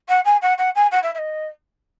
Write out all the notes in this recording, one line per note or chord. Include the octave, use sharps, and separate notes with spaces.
F#5
G#5
F#5
F#5
G#5
F#5
E5
E5
D#5